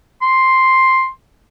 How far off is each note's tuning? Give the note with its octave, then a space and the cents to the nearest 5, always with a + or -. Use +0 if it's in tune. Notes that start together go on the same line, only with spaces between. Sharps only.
C6 +5